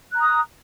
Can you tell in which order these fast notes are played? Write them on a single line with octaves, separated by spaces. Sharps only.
F#6 A#5 D#6